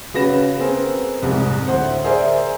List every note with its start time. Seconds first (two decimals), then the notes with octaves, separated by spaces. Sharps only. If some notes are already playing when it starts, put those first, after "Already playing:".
0.14 C#3 C#4 F#4 B4 A#6 E7
0.59 B3 C4 G#4 A#4
1.22 C2 F2 G#2
1.67 D2 A2 C5 F#5
2.04 G#4 A#4 C5 D5 E5